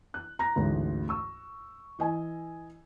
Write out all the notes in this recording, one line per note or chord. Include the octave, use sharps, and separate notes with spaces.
F#6
A#5 A#6
A1 D2 G#2
C#6 E6
E3 D#5 G#5